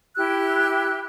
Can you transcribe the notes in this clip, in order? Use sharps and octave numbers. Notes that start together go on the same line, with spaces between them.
E4 G4 E6 F#6